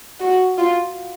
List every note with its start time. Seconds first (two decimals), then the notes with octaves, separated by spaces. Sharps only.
0.20 F#4
0.58 F4